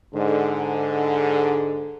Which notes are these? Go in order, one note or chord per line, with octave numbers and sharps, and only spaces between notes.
G#2 D3